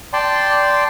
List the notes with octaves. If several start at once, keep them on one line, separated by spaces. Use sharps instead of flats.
D5 G5 A5 C6